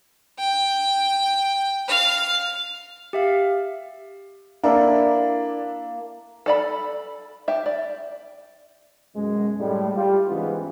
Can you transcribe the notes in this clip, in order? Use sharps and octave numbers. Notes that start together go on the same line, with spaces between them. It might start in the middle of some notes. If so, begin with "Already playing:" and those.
G5
F5
G4 E5 F5
A#3 D4 E4 A4
A4 D5 B5
G4 E5
D5
F#2 B2 G#3
A2 G3 G#3
G3 F4 G4
G#2 C#3 E3 G#3 B3 F4